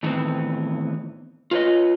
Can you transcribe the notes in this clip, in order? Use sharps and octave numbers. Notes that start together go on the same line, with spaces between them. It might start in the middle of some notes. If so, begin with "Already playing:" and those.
A2 D#3 E3 B3 C4
F4 B4 C#5 D#5